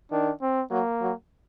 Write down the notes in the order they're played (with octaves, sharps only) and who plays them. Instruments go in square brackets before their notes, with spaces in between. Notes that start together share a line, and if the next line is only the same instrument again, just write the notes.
[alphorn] D#3 [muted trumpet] D4
[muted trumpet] C4
[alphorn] F#3 [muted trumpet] A#3
[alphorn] F#3